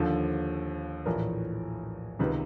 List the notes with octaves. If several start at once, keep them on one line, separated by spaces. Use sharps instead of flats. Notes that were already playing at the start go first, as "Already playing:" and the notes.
Already playing: D#2 D3 F3 A4
A#1 A2 E3 A#4
C#2 C3 D#3 B4